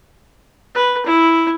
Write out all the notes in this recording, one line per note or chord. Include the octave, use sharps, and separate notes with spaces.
B4
E4